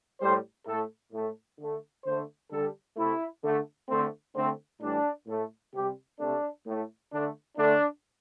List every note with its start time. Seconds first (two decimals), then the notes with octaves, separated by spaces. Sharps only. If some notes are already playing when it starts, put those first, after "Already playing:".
0.20 A2 G3 C5
0.66 A2 A3 A4
1.12 A2 A3
1.58 D3 A3
2.05 D3 A3 C5
2.50 D3 G3 A4
2.96 C3 A3 E4
3.43 D3 A3
3.89 D3 A3 C4
4.34 D3 A3 C4
4.81 A2 E3 G3 D4
5.26 A2 A3
5.73 C3 G3 G4
6.19 C3 A3 D4
6.66 A2 A3
7.11 D3 A3 D4
7.57 D3 A3 D4